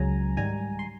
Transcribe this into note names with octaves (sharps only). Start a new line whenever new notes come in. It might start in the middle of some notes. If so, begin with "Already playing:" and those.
Already playing: C#2 C#3 F#3 G#5 A#5
G#2 D#3 G3 G#5 A#5
C6